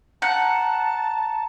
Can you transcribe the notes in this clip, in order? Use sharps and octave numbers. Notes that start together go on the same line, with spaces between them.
F#5 A5 A#5